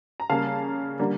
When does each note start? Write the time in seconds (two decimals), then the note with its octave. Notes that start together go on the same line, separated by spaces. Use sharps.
0.20 A#5
0.29 C#3 G3 A#3 F5 A5
0.99 D3 G3 A#3